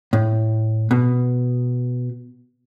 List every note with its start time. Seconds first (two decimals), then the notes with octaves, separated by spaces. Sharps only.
0.13 A2
0.91 B2